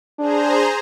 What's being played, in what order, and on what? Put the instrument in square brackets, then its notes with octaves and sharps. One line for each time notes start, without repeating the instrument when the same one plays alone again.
[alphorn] D4 [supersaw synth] G#4 C5 A#5